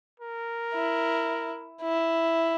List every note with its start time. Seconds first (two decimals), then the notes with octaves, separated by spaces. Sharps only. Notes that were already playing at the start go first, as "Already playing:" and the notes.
0.20 A#4
0.74 E4
1.82 E4